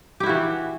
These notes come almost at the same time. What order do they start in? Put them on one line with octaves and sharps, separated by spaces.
G4 E4 F#4 E3